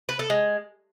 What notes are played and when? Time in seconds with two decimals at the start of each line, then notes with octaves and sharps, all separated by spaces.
0.09 B4
0.19 A4
0.30 G#3